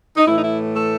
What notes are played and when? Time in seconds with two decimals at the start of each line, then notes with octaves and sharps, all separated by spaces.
0.17 D#4
0.27 A2 E3 A3 E4
0.36 D#4
0.43 E4
0.76 A4